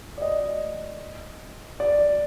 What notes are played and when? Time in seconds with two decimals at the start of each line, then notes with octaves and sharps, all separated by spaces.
0.18 D5
0.22 D#5
1.80 D5